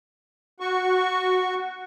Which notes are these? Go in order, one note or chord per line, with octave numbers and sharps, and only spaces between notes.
F#4 C#6